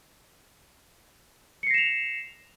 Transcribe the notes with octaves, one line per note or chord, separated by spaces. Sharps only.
A#6 C7 C#7 E7 F7